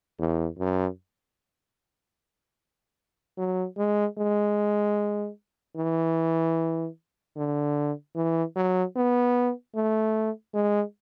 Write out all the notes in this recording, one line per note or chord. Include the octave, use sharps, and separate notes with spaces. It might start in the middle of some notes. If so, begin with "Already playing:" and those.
E2
F#2
F#3
G#3
G#3
E3
D3
E3
F#3
B3
A3
G#3